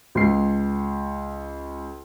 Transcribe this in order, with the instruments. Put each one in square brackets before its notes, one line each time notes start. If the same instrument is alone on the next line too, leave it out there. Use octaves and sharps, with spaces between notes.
[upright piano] C#2 C7